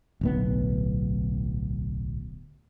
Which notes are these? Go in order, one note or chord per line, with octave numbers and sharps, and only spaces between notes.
D1 B1 B3